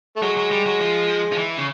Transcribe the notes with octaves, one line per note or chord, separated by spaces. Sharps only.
A3
F#3 G#3
F#3
G3
F#3
F3
F3
E3
C#3